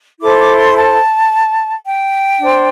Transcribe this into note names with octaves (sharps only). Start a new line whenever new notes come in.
E4 A4 C5 D6
D6
C6
A5
G5
D4 C5